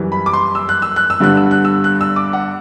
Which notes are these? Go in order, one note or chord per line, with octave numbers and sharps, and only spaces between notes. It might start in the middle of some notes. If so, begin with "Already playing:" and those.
Already playing: F#2 E3 G3
B5
D6
C6
E6
F#6
E6
F#6
E6
G2 D3 G3 B3 F#6
E6
F#6
E6
F#6
E6
D6
F#5